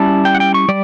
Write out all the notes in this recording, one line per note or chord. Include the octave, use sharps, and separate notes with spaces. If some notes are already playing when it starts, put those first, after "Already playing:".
Already playing: G3 C#4 E4 A5
G5
F#5
G5
C#6
G3 D5